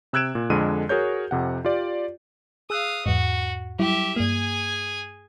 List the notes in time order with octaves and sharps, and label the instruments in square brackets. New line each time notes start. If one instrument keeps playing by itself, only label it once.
[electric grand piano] C3 E6 F#6 G#6 D7 E7
A#2
F2 D3 G#3 D#7
F#4 G#4 A#4 C#5 G6
F2 C3 F#5
F4 G4 D5
[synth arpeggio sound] G#4 E6 F#6 [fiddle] F5 D#6
[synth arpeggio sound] E2 G#2 [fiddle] F#4
[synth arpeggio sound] F#3 G3 E4 [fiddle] G4 E5
[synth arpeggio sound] G2 A#3 [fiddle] G#4 G#5